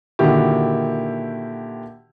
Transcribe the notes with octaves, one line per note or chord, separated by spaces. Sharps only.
A#2 D3 D#3 E4 F#4 G4